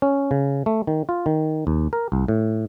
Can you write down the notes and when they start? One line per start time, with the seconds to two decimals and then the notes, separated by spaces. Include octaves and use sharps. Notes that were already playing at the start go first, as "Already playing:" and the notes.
0.02 C#4
0.31 C#3
0.66 A3
0.87 D#3
1.09 F4
1.26 D#3
1.67 D#2
1.93 A#4
2.12 C2
2.28 A2